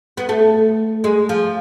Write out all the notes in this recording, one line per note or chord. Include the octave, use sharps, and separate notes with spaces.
B3
A3
G#3
F3